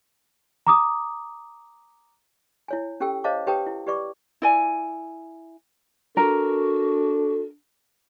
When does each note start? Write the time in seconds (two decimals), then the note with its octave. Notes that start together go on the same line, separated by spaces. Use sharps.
0.67 A#5 D6 D#6
2.68 E4 C#5 G#5
3.00 C#4 G4 A4 G5 E6
3.24 C5 C#5 D#5 F5 A5 D6
3.47 G4 B4 C#5 G5 A5 D#6
3.66 E4
3.87 G4 B4 D5 C#6 D6
4.42 E4 D5 G#5
6.17 D4 F#4 A4 A#4